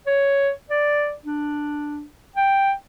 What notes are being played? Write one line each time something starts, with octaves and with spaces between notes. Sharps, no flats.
C#5
D5
D4
G5